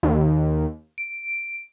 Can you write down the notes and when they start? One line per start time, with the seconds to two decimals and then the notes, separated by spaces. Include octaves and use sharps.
0.03 D#2
0.98 D7